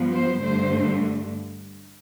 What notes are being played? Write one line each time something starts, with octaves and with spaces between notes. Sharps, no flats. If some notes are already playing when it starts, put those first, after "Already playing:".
Already playing: G2 F3 B3
C5
G2 D3 A3 C5